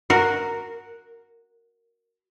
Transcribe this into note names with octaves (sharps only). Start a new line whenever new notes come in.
F#4 A#4